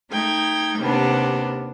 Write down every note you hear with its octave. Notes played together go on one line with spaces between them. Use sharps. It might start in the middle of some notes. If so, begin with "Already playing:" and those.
A3 D#4 G5 G#6
D#2 C3 B3 D4